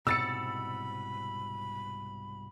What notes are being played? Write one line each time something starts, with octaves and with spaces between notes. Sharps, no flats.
C2 G#2 B2 B5 E6 A6 C#7